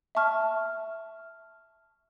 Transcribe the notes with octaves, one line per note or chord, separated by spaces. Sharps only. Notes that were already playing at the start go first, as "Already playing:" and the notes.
E5 A5 C#6 F6